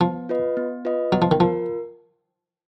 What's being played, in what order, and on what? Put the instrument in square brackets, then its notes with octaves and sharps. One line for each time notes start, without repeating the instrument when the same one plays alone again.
[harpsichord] F3 [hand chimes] B3
[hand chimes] F4 B4 D#5
B3
F4 B4 D#5
[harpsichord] F#3 [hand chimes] B3
[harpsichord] F3
D#3
[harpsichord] F3 [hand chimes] F4 A#4